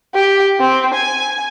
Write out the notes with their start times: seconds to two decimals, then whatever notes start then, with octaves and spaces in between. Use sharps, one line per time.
0.15 G4
0.60 C4
0.94 G#5